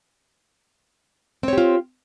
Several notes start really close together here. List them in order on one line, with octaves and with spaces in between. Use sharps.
C4 C#5 G4 F4